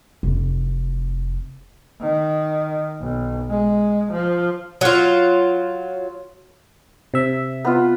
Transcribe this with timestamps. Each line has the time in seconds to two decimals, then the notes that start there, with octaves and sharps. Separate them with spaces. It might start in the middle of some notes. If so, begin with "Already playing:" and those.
0.23 F1 E3
2.01 D#3
3.01 B1
3.50 G#3
4.13 F3
4.81 F#3 F4
7.14 C3 E5
7.65 B3 F4